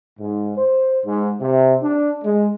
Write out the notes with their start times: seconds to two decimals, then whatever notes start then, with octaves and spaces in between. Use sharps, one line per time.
0.20 G#2
0.56 C5
1.05 G#2
1.41 C3
1.81 D4
2.24 G#3